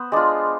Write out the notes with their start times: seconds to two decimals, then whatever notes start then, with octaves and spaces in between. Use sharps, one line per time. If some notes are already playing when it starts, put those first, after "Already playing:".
Already playing: B3 C5
0.12 G#3 D4 F4